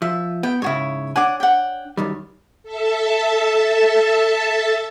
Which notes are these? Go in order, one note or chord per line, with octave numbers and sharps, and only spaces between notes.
F3 E5
B3 G5
G#2 C#3 E4 F#4 C#5
D4 C#5 F#5 G#5 D6
F#5 G5
F#2 D#3 G3
A4 E5 A5